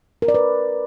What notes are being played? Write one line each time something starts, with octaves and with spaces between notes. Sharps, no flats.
A#4
D5
B4